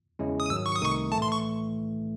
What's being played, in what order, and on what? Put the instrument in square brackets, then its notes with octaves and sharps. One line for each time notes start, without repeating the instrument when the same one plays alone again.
[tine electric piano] E2 C#3 G#3 C#4 E4
[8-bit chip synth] D#6
[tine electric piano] G#2 D#3 F#3 [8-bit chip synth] E6
[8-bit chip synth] C#6
D#6
[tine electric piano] C2 C3 D#3 A3 D#4 [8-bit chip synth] C#6
[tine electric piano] A2 E3 A3 [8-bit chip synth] A5
[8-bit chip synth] C6
C#6